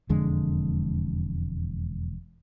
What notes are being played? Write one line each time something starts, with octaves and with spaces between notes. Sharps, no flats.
E1 F2 D3 G#3